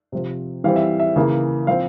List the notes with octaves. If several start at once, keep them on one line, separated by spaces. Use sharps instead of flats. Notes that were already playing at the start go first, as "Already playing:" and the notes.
C3 F3 C4
E3 G3 C4 F5
E5
E5
C#3 E3 A#3
F3 C4 F5